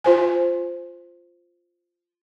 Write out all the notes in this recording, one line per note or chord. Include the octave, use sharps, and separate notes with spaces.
F4 C5 G#5